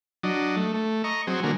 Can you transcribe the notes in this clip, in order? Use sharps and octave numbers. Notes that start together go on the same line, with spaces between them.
F#3 D4 D#5
A3
A3
D#5 A#5 C#6
F#3 C4 G#4
D3 F#3 G#3 A#3